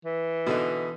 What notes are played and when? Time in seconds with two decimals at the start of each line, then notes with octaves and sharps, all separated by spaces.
0.05 E3
0.47 B2 D3 D#4